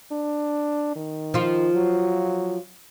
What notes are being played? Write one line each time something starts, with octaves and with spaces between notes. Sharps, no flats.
D4
D#3
F3 F4
F#3